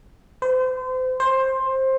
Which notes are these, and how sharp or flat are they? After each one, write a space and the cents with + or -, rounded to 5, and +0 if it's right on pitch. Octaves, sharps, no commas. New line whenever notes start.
C5 -35
C5 +15